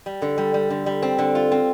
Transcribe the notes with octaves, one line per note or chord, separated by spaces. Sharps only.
G3
D3
G3
G3
D3
G3
C4
D3
F4
C4